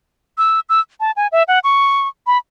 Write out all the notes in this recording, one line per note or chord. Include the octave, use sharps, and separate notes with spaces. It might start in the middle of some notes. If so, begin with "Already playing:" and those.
E6
E6
A5
G#5
E5
F#5
C#6
B5